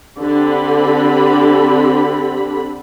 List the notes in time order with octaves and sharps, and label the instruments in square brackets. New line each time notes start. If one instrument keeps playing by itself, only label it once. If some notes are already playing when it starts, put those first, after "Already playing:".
[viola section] D3 C4 G4 B5